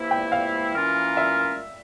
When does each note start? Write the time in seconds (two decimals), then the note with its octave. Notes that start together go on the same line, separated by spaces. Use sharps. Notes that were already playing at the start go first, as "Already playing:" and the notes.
Already playing: C3 E3 A#3 E4
0.11 G5
0.32 F5
0.74 E3 A#3 C#4 F4 A#4
1.17 E5